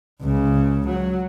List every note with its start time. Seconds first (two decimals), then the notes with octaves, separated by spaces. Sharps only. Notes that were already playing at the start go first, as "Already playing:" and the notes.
0.21 C#2 C#3
0.86 F#3